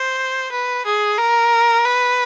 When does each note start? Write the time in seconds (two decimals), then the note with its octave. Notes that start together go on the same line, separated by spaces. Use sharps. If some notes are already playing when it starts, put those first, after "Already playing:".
Already playing: C5
0.51 B4
0.85 G#4
1.19 A#4
1.85 B4